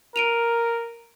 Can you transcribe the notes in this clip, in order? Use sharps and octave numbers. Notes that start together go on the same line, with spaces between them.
A#4 D7 D#7 F7